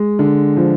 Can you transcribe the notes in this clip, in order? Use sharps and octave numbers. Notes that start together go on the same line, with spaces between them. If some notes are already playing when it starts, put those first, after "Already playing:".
Already playing: G#3
D3
F3